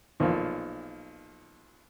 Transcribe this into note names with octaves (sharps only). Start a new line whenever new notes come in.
B1 A#2 F3